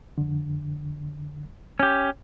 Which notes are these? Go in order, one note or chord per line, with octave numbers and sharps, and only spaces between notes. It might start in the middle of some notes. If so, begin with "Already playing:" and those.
F2 D3
C#4 G4